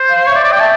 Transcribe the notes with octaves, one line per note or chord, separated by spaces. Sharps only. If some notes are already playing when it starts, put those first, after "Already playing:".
Already playing: C5
F5
C#5 F5
D5 E5
D5
G5
E5 A5